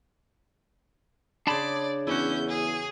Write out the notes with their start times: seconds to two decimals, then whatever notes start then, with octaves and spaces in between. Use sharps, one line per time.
1.47 C#3 D4 G#4 D5 A5 B5 C6
2.07 E2 C#4 E4 F#4 G6
2.49 G#4